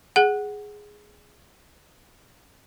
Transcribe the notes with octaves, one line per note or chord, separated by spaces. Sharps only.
G#4 F#5